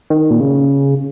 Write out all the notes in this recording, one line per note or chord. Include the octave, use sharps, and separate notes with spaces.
D#3
A#2
C#3